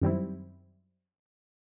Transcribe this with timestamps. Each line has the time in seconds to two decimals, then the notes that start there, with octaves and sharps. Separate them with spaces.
0.02 F#2 D#3 G3 C4 E4